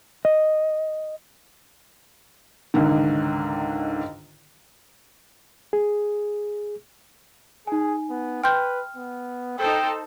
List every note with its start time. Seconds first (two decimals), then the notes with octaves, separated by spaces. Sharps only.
0.25 D#5
2.74 C#2 G#2 D3 D#3
5.73 G#4
7.67 D#4 G#4 G#5
8.10 B3
8.44 B4 G5 C6 F6 G6
8.96 B3
9.58 D#4 A4 C5 G5